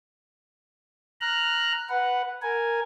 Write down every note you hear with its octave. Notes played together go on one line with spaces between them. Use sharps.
A#5 F6 F#6
B4 F#5
A#4 G#5